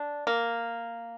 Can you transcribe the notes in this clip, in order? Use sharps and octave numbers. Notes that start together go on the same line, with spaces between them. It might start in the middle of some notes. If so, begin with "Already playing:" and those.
Already playing: D4
A#3